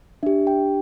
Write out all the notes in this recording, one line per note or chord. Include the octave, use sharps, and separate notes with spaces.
D4 G4 E5
G5